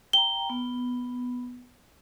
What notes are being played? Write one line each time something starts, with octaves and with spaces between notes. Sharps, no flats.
G5 A#5 G7
B3